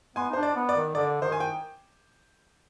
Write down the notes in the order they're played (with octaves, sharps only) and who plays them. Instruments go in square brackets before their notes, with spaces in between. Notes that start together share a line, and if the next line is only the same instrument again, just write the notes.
[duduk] B3 [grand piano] G#5 C6
[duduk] D#4
[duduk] D4 [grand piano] C5
[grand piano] D5
[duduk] B3
[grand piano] D5
[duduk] D#3
[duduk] D3 [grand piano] D5
[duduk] D#3 [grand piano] C5
[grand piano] G#5
G5